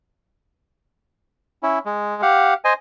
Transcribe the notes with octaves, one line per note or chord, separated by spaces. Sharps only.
C#4 E4
G#3
G4 F5 F#5
C5 D#5 G#5